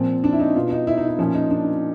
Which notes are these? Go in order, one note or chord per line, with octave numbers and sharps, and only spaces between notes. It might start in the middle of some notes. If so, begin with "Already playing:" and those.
Already playing: A#2 F3 C4
D4
E4
D#4
B2 F4
D#4
E4
D#4
E4
A#2 F3 C#4
D#4
D4